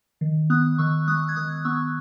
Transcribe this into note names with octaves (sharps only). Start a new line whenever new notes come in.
D#3
B3 D#6 F#6
D#3 C#6 E6
G#3 D#6 F#6
G#6
D#3 D#6 F#6
B3 C#6 E6